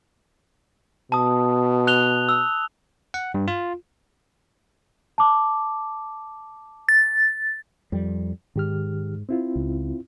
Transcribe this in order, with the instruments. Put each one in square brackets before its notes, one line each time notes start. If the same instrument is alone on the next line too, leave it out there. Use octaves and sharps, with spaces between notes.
[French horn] B2 [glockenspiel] A5 D#6
[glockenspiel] F#6 F7 G7
E6
[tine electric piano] F#5
G2
F4
[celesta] A5 D6
[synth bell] A6
[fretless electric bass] F2 G3
[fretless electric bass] G#2 [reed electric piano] D#3 G4 F6
[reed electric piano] C4 E4 F4
[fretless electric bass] C#2